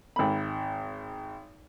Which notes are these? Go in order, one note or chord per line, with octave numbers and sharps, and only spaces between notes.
G#1 B5